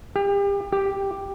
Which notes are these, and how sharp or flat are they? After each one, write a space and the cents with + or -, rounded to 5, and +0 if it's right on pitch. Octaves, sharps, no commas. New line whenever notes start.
G4 +35
G4 +5